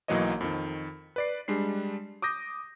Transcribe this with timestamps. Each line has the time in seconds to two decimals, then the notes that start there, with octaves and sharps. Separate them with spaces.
0.08 B1 E3 F#3 A#3 C#5 D#5
0.41 F2 D#3
1.16 B4 D5 C7
1.48 G3 G#3 D4 C7
2.22 D6 D#6 G6 A#6